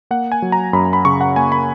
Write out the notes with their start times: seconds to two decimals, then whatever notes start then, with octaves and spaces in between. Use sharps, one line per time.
0.11 A#3 F#5
0.32 G#5
0.42 F#3
0.52 A#5
0.73 F#2 B5
0.93 B5
1.05 C#3 C#6
1.21 F#5
1.36 A#3 G#5
1.52 B5